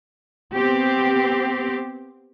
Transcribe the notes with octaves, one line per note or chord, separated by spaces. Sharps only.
B3 C4 G4